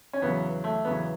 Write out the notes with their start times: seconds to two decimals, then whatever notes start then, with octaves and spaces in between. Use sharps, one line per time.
0.13 C#4
0.22 E2 C#3 F#3 B3
0.64 A3
0.85 E2 C#3 F#3 B3